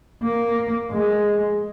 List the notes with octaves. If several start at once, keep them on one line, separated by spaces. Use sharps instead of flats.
A#3
G#3